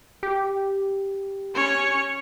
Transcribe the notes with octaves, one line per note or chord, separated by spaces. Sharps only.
G4
C#4 C#5